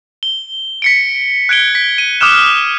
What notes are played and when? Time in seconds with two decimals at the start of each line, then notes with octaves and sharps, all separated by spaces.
0.23 G7
0.82 B6 C#7 D7
1.49 F#6 G#6 D7 G7
1.75 B6
1.98 D#7
2.21 D6 D#6 F6 F#6 E7